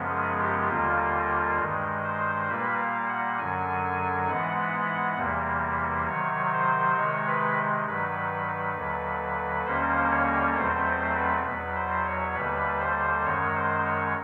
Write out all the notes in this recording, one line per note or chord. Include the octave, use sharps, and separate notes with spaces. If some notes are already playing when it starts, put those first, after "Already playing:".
Already playing: F#2 C#3 F3 G#3 B3
G#4
G4
D#2 D3 G3 A#3 F4
G2 D#3 G#3
C5
A#2 G3 A#3 B4
F5
F#5
F#2 D3 F#3 G#5
G#5
G#2 E3 G#3 B3 F#5
E2 C3 E3 G3 A#3
C3 D#3 F#3 C#5
C5
C3 D#3 G#3 C#5
B4
G2 D#3 F#3 B4
D#2 D3 F#3
D#2 D3 G3 A#3 C#4 C5
C#5
E2 B2 F#3 A3 C4 C5
C5
B4
E2 B2 F#3 B4
C5
C#5
D#2 D3 G3 B4
C5
F#2 D#3 G#3 C#5
C5
C#5